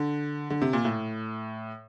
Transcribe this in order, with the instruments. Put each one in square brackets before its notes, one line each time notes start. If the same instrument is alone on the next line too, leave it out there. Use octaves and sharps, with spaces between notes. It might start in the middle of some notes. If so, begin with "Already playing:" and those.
Already playing: [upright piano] D3
D3
C3
A#2
A2